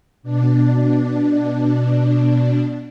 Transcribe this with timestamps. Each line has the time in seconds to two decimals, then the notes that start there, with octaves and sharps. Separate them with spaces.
0.23 B2 D4